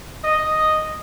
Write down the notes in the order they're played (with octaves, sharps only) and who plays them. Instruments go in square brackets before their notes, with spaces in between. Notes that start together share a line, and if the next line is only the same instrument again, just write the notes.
[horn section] D#5